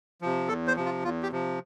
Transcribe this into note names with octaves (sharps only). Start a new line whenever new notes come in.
C3 F3
E2 A4
C5
C3 F3
F4
E2 F4
G4
C3 F3